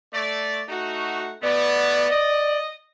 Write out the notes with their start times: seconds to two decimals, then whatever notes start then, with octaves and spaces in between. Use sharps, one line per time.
0.14 A3 D5
0.69 A3 D#4 F#4
1.42 B2 A3 B3 D5
2.10 D#5